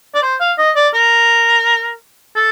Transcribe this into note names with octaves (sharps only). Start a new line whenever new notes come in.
D5
C5
F5
D#5
D5
A#4
A4